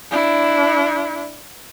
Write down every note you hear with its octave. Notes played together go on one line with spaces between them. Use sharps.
D4 E4